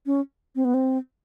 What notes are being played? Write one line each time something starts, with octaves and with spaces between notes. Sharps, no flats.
C#4
C4
B3
C4